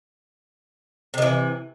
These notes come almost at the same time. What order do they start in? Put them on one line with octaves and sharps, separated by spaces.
C3 D#3 E3